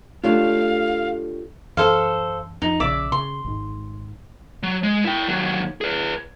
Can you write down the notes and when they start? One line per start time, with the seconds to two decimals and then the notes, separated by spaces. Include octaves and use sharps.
0.24 A3 D4 F4 G4 C#5 F5
1.77 F#2 E3 A4 C5 F5
2.62 F2 D#4
2.80 A#1 C#3 D5 E5 D6
3.12 C#3 C6
3.44 G#1 G#2
4.63 F#3
4.83 G#3
5.04 E4 G5
5.28 D#2 F#3
5.81 G#4 B4